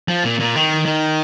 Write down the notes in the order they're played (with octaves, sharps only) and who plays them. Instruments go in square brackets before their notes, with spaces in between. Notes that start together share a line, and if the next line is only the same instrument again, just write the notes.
[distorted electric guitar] F3
A#2
A#2
D#3
D#3